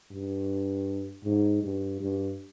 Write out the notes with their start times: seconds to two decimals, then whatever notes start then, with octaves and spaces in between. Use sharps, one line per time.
0.11 G2
1.24 G#2
1.63 G2
2.00 G2